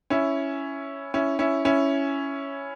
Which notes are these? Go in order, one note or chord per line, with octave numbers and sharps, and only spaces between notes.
C#4 E4
C#4 E4
C#4 E4
C#4 E4